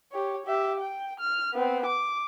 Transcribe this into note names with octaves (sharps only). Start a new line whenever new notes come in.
G4 C#5
G4 E5
G5
F6
B3 C4
D6